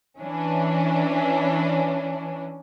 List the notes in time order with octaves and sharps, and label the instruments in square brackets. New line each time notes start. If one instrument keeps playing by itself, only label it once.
[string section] E3 C#4 D4